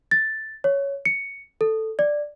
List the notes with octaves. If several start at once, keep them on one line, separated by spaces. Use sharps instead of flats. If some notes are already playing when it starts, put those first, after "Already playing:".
A6
C#5
C#7
A4
D5